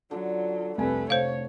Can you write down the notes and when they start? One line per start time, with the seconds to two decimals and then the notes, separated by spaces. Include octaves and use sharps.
0.11 D3 F#3 F4
0.78 C2 F2 A3 B4 G#5
1.10 F1 C5 C#5 F5